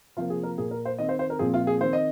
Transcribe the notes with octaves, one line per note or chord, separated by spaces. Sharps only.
C3 F3 A#3 F4
G#4
A#4
A#2 A#3 G#4
A#4
C5
D#3 C4 D#5
C5
C5
A#4
A#2 F3 C4 G#4
F4
G#4
D#3 C4 C5
D#5